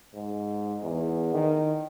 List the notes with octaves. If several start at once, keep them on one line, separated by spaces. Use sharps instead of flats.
G#2
E2
D#3